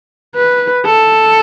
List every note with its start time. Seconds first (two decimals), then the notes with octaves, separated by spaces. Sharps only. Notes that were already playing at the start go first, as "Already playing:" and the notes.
0.36 B4
0.86 A4